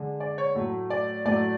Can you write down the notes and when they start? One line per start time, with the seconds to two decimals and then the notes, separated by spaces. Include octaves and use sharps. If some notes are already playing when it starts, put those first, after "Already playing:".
Already playing: D3 G#3
0.20 D5
0.38 C#5
0.55 A2 F#3 A3
0.90 D5
1.25 A2 F#3 A3 D5